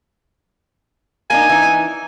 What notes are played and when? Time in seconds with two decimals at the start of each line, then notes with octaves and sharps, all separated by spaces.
1.30 A#3 D4 D#4 G#5
1.49 E3 D#4